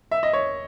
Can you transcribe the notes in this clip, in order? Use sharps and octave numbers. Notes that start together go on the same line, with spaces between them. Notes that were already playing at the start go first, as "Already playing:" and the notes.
E5
D#5
C#5